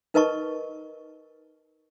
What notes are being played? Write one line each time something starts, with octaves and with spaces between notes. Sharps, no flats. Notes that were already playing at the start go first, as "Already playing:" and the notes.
D#4 A#4 B4 D#5 A5 C#6